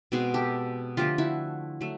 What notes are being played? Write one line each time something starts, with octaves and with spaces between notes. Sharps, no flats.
B2 G#3 C4 F#4 G#4
G4 A4
D3 F3 A3 F4 G4
E4 F#4
F#3 A3